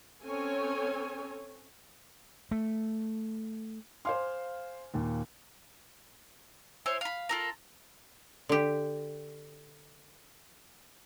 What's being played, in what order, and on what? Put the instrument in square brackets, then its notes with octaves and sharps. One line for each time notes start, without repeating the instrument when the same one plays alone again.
[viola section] C4 C#4 A4 C#5 G#5
[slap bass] A3
[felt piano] C5 F5 C6 [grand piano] G#5 D6 F6
[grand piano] D#2 A#2
[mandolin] E4 C5 C#5 G#5
F5 B5
F4 A4 A#4
[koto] D3 G4